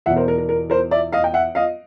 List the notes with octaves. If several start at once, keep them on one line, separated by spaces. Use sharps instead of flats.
E2 B2 E5 F#5
A#4 C5
A#4
A#4
A#4
A#4 C5
D5 E5
D#5 F5
G5
E5 F#5
D#5 F5